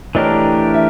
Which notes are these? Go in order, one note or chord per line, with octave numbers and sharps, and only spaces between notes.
E3 A3 D4 G4 A#4 C#5 D#5
E5